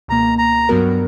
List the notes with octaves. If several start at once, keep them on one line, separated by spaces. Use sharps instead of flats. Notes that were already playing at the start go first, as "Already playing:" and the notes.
C#2 B2 A#3 A#5
A#5
G2 F#3 B3 F#4 A#4